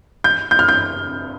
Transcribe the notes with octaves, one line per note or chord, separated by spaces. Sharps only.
G6
G6
F6
G6